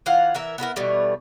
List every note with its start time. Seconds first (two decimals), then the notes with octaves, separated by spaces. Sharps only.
0.06 E3 F4 F5 F#5
0.35 E3 A#4 E5
0.58 B3 E4 A4 A#4
0.76 B2 E3 G3 A3